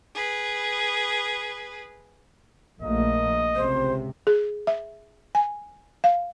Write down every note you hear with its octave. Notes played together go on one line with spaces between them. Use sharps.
G#4 B4
A#1 A3 A#3 D#5
C#2 C3 C5
G#4
E5
G#5
F5